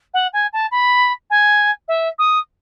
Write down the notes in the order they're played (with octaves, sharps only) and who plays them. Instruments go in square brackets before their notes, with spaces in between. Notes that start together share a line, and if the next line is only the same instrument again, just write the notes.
[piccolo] F#5
G#5
A5
B5
G#5
E5
D#6